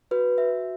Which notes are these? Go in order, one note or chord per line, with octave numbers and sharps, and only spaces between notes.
F#4 B4
F#4 E5